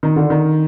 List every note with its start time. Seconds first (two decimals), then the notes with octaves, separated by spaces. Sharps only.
0.03 D#3
0.16 D3
0.30 D#3